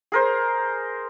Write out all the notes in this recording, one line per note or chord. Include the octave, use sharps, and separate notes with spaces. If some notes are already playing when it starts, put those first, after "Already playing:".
G#4 A#4 C5